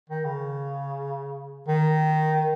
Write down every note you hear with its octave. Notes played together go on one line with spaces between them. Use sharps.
D#3
C#3
D#3